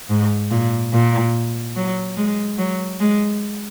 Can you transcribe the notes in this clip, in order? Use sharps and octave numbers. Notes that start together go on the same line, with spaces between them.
G#2
A#2
A#2
F#3
G#3
F#3
G#3